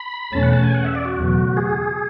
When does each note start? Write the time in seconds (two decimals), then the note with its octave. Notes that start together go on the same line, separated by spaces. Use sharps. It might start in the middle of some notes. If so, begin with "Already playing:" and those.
Already playing: B5
0.32 E2 B2 A3 C#4 A5
0.43 F#5
0.53 A5
0.63 G#5
0.75 F#5
0.85 E5
0.95 D5
1.05 F#4
1.16 F#1 E2 B2 F#3 A3
1.57 G#4